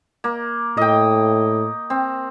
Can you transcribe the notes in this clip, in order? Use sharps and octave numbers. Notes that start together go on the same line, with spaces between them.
A#3
A2 D#5 G5
C4